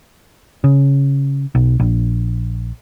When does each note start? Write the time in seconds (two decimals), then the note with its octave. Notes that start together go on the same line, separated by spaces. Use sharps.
0.64 C#3
1.55 B1
1.80 A#1